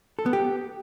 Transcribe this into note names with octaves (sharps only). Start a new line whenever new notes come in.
A4
B3
G4